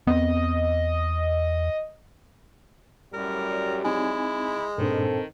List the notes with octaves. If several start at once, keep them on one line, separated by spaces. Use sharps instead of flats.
E2 B3 C4 D#5
F#2 A2 F#3 G3 A#4
G#3 C4 D#4 E4 G#5
G2 A#2 D#3 C4 D4 A4